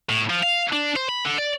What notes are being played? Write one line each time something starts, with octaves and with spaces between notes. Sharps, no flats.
A2
F3
F5
D4
C5
B5
D3
D5